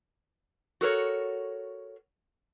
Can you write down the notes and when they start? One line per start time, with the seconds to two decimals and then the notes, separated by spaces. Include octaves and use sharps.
0.81 F#4 A4 A#4 C#5